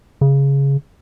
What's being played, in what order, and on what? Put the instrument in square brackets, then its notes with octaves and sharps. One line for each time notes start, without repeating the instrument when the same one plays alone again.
[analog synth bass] C#3